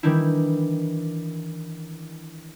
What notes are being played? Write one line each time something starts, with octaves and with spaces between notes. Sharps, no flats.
D#3 E3 G3 D4 E4